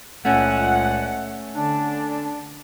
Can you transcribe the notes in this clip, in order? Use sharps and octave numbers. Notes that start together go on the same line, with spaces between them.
C#2 A#2 A3 C#4 F#5
D3 D4